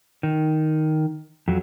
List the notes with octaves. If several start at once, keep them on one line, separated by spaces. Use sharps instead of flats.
D#3
F2 F#3